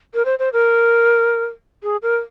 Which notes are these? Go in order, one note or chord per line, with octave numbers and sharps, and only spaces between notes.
A#4
C5
C5
A#4
G#4
A#4